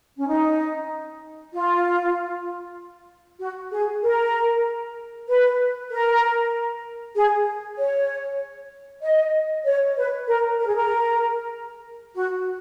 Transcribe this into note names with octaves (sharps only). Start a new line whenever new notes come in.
C#4
D#4
F4
F#4
G#4
A#4
B4
A#4
G#4
C#5
D#5
C#5
B4
A#4
A#4
G#4
A#4
F#4